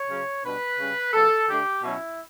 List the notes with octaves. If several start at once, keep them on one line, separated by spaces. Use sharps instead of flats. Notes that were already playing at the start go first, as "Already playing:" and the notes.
Already playing: C#5
C#3 F#3 C#4
B2 G3 D4 B4
C#3 G3 C#4
C#3 F#3 B3 A4
D3 A3 D4 G4
B2 F#3 C#4 E4